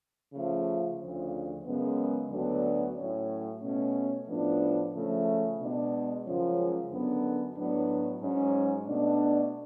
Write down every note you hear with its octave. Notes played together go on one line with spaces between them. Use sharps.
C#3 F3 A3
D2 C#3 F3
F#2 C#3 G#3 B3
D2 D3 F#3 B3 D4
A2 F#3 C#4
B2 A3 C#4
A2 F3 B3 D4
C#3 F3 A3
B2 G#3 D4
F#2 C#3 F3 G#3 C#4
F#2 D3 F#3 B3 D4
A2 F#3 B3 D4
G#2 F#3 C#4
B2 A3 D4